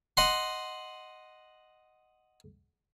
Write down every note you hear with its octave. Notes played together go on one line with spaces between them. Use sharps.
D#5 F#5 C6